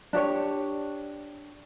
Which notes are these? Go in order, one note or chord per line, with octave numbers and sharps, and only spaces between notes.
D4 G4 C#5